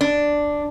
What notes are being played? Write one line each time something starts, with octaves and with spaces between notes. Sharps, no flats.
D4